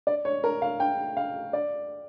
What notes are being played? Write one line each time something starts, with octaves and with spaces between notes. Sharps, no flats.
D5
C#5
A#4
F5
G5
F5
D5